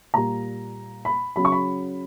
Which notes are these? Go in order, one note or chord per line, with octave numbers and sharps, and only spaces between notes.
A#2 G3 A#5
B5
C#3 F#3 B5
C#6
B5